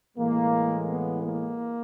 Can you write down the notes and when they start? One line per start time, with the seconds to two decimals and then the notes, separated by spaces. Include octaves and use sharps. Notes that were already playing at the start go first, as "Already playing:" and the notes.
0.16 A2 E3 G#3 A#3
0.87 B3
1.22 A#3